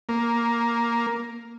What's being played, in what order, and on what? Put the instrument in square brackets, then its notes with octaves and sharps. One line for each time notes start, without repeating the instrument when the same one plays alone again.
[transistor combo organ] A#3